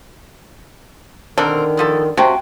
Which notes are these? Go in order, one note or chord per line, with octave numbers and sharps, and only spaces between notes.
B2 D3 D#3 C4 A#4
A2 F3 A4
C3 C#4 F#4 F5 G5 A5